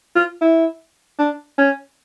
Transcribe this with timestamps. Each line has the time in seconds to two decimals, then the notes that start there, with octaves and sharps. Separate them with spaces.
0.16 F4
0.41 E4
1.19 D4
1.58 C#4